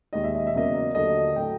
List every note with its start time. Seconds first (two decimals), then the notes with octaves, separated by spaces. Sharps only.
0.13 D#2 D#3 G#3 D#5
0.24 E5
0.35 D#5
0.47 E5
0.54 E2 C#3 F#3 A#3 D#5
0.95 D#2 D3 F#3 A3 D#5
1.36 A2 F#3 A3 G5